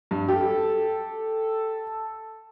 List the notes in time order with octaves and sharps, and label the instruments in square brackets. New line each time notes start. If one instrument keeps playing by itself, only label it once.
[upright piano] G2
[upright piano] G4 [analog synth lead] A4